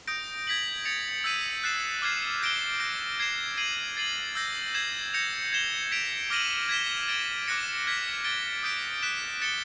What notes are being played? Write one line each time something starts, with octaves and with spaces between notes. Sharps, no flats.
D#6 G6 A#6 D7
G#6 B6 D7 F#7
A6 C#7 F7
E6 G6 B6 D#7
F#6 A6 C7 E7
D6 F6 G#6 C7
G6 A#6 D7 G7
G6 A#6 D7
G#6 C7 E7
G#6 C7 D#7 F#7
A6 C7 D#7 F#7
E6 G6 A#6
E6 G#6 C7 E7
G6 A#6 C#7 F7
G#6 C7 E7 G7
G#6 B6 D7 F7
D6 F6 A#6 D#7 F#7
G#6 B6 E7 G7
A6 D7 G7
D6 F#6 A#6 C#7
F6 G#6 B6
A6 D7 G7
D#6 G6 B6 D7
F#6 B6 E7
A6 C#7 E7 G7